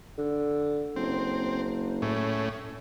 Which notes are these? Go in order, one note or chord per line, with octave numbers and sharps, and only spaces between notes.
D3
F#1 C4
A2 C#4